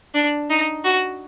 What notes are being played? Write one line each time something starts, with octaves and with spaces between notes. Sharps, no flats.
D4
D#4
F#4